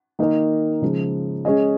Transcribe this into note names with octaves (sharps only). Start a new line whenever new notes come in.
D#3 A#3 D#4 A#4 D#5
C#3 F3 G#3
G#3 C#4 G#4 D#5